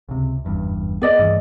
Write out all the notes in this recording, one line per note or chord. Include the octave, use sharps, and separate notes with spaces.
C#2 C3
F#1 E2 G2
B3 G#4 D5 D#5
G2 E3 A3